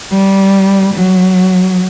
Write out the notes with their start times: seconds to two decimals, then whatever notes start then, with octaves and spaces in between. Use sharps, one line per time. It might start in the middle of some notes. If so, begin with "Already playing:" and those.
0.12 G3
0.94 F#3